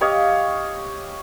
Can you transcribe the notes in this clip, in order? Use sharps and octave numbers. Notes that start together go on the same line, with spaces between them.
G4 C#5 D#5 F5